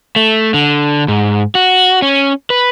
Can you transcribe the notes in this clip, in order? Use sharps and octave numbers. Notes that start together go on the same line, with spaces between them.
A3
D3
G#2
F#4
C#4
B4